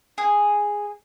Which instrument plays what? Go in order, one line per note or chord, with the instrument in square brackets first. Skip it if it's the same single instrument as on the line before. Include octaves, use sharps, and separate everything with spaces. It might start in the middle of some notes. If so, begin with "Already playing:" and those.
[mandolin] G#4